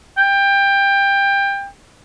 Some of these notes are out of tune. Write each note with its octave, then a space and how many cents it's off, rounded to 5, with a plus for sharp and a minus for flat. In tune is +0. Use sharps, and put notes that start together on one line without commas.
G5 +20